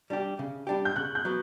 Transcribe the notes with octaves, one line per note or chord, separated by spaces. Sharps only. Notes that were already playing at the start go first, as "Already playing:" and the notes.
G3 D4 G4
C#3
G3 D4 G4
G6
C#3 F#6
G6
F#3 B3